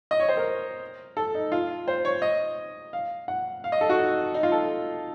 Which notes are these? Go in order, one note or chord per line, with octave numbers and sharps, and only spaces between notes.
D#5
C#5
C5
A#4
A4
D#4
F4
C5
C#5
D#5
F5
F#5
F5
D#5
A4
F#4
D#4
D#4
F4
A4